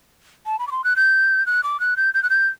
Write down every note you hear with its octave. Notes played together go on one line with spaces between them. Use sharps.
A5
B5
D6
C6
F#6
G6
F#6
D6
F#6
G6
G6
F#6
G6